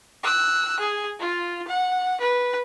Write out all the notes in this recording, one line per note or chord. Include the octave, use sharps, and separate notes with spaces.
E6 F#6
G#4
F4
F#5
B4